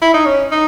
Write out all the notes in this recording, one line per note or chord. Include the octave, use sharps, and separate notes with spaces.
E4
D#4
C#4
D#4